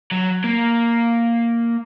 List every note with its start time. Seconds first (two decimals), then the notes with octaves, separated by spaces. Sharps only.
0.12 F#3
0.44 A#3